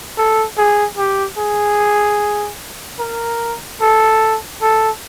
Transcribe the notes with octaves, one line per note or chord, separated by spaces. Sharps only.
A4
G#4
G4
G#4
A#4
A4
A4